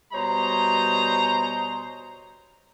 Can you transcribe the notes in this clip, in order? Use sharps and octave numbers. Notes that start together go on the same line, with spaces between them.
B2 G3 C5 C#5 D#5 A#5